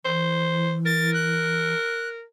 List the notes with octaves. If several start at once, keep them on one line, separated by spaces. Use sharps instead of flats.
E3 C5
A#4 A6
F#6